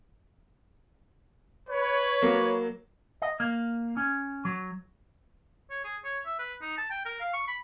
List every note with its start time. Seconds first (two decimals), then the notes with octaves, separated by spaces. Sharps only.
1.69 B4 C#5
2.22 F#3 A#3
3.22 D#5
3.40 A#3
3.97 C#4
4.45 F#3
5.70 C#5
5.84 G#4
6.04 C#5
6.26 E5
6.39 B4
6.61 D#4
6.78 A5
6.91 G5
7.05 A#4
7.20 F5
7.33 C#6
7.48 B5